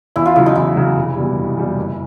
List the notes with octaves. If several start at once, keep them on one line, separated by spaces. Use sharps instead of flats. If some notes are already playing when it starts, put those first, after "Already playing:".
E2 E4
F4
C#3 F#3 E4
D#4
E2 E4
C#3 F#3
F1
E2 B2 G3
F1
E2 B2 G3
F#1